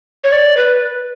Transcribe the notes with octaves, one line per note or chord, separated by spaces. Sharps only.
C#5
D5
B4